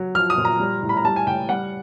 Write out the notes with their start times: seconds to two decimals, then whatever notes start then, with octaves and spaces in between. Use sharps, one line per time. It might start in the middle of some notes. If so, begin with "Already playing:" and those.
Already playing: F#3
0.15 F3 F6
0.30 D#6
0.37 A#2
0.45 A#5
0.60 G3
0.83 A2
0.89 B5
0.97 A#5
1.04 G3 A5
1.16 G#5
1.27 A2 G5
1.49 G3 F#5